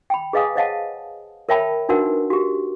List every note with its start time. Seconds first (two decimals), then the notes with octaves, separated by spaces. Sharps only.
0.10 G5 B5
0.33 G#4 B4 D#5 F5 G#5 D#6
0.56 C5 C#5 D#5 F5 F#5 A5
1.49 A#4 C#5 E5 G5 A5 B5
1.89 D4 D#4 F#4 A#4 B4 F#5
2.30 F#4 G4